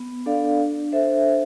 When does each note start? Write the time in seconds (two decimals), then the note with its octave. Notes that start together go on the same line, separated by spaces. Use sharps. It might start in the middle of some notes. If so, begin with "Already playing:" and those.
Already playing: B3
0.26 D4 A4 D5 F5
0.59 D4
0.92 A4 C5 E5